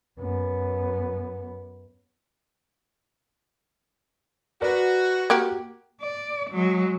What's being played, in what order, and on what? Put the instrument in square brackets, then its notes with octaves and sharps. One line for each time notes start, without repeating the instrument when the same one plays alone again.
[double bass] F#2 B3
[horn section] F#4 [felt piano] A#4 B4 D5
[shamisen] A#3 F#4 G4
[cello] D5
F#3 G#3